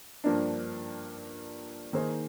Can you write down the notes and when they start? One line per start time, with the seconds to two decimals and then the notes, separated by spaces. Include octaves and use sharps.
0.24 G2 F3 A#3 D4
1.93 D#3 A#3 D#4 G#4 C5